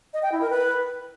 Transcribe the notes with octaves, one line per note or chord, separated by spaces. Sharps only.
D#5
G5
E4
A#4
B4